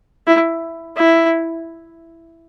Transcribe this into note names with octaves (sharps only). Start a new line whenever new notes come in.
E4
E4